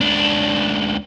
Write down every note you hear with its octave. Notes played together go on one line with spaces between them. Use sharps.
C#2 D4